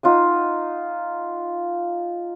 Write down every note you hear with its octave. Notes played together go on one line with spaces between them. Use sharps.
D#4 F4 F#5 D#6